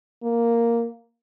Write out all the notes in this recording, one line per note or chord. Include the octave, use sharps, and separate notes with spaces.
A#3